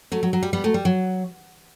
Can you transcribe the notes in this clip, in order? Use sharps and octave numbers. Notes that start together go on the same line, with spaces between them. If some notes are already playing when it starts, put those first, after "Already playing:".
F#3 A3
F#3
F#3
G3
G3 B3
F#3 A3
G3
F#3